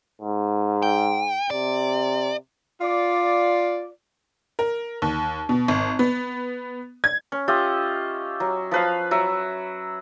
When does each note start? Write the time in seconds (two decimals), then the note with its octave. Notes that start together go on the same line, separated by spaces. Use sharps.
0.21 G#2
0.82 G5
1.50 C3 D5
2.81 F4 D5
4.59 A#4
5.02 D#2
5.49 B2
5.68 G#1
5.99 B3
7.04 G#6
7.32 C#4
7.48 F4 G4 D#5 E5
8.40 F#3
8.71 F3 B4 F5
9.11 F#3 E5